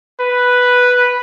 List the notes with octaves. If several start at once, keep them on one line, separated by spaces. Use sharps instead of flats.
B4